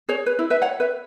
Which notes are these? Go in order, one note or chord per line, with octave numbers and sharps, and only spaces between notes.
G#4 C#5
B4
E4
B4 E5
C#5 F#5
B4 E5